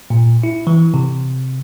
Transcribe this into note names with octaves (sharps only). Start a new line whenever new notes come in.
A#2
E4
E3
C3